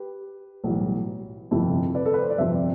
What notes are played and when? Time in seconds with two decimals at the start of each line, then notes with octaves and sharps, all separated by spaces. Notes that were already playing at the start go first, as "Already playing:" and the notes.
Already playing: G4 B4
0.64 B1 A2 E3 G3
1.51 G1 F2 C3 E4
1.95 B4 D5
2.05 A4
2.14 B4
2.22 C5
2.30 D5
2.38 G1 F2 C3 C5 E5